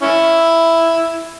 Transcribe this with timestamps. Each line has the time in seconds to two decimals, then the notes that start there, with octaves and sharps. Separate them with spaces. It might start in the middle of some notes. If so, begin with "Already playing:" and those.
0.01 C#4 E4